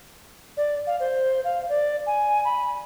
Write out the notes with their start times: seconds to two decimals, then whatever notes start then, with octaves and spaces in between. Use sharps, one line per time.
0.57 D5
0.87 F5
1.00 C5
1.44 F5
1.69 D5
2.07 G#5
2.45 B5